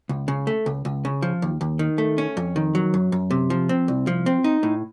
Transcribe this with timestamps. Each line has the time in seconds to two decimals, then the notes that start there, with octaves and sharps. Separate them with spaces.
0.09 C#2
0.28 C#3
0.47 A3
0.66 C#2
0.85 C#2
1.05 C#3
1.22 F3
1.42 D#2
1.61 D#2
1.79 D#3
1.98 A3
2.18 C#4
2.37 F2
2.56 D#3
2.75 F#3
2.94 F#2
3.12 F#2
3.31 C3
3.50 F3
3.69 C4
3.88 C2
4.07 F3
4.26 C4
4.44 D#4
4.63 A2